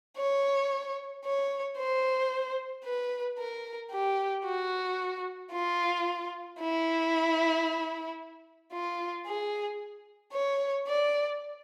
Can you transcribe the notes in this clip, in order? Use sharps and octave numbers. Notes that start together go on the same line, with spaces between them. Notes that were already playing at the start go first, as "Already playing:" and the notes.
C#5
C#5
C5
B4
A#4
G4
F#4
F4
E4
F4
G#4
C#5
D5